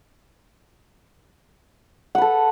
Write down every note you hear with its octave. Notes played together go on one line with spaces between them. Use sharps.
A4 B4 F#5